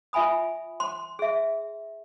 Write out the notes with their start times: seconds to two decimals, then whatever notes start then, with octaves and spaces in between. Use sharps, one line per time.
0.13 F4 E5 G#5 B5 D#6
0.80 C6
1.19 G#4 E5